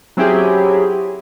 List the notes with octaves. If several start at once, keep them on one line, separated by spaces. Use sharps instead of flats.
F#3 C4 C#4 E4 G4 G#4